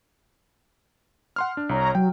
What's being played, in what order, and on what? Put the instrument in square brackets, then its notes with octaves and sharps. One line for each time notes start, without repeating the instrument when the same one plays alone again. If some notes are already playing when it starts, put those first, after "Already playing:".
[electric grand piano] F#5 C6 F6
D4
[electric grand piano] C2 [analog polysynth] C#5 A#5
[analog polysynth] F#3 [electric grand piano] G5